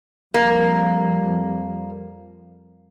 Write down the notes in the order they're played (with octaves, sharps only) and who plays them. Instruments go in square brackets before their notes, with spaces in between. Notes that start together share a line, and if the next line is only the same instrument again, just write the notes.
[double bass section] F2 F3 G3 [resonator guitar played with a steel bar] A#3